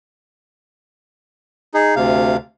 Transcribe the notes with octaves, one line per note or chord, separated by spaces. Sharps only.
D#4 G#4
D2 C3 F5